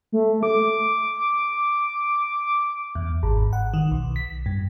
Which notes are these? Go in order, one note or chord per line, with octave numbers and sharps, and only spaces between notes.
A3
D6
E2
G#1
F#5
D#3
B1
B6
G2